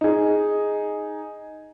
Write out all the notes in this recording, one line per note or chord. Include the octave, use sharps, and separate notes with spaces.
D#4 G#4